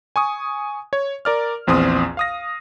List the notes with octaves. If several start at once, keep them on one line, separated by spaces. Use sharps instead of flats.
G#5 C#6 D#6
C#5
A#4 D5 F6
A#1 E2 C4 C6 D#6
F5 D#6 A#6